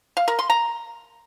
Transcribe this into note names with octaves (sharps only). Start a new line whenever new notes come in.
F5
A#4
C6
A#5